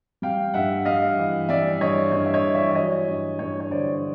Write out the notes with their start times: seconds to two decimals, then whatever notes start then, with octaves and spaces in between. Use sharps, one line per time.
0.22 G3 F5 G5
0.54 G2 E5 F#5
0.85 G2 D#5 F5
1.18 E3
1.49 G3 D5 E5
1.81 G2 C#5 D#5
2.12 G2 C#5
2.26 E5
2.34 C#5 D#5
2.44 E3
2.55 D5 E5
2.70 E5
2.75 F#3 C#5 D#5
3.08 G2
3.39 G2 C#5
3.60 C#5
3.71 D3 C5 D5